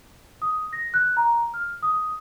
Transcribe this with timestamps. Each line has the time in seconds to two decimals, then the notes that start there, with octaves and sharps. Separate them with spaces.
0.42 D#6
0.73 A#6
0.94 F#6
1.17 A#5
1.54 F6
1.83 D#6